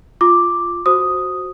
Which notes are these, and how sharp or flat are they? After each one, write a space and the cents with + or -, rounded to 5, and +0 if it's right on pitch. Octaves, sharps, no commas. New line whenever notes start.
F4 +0 D6 +0
F#4 +0 C5 +0 D#6 +0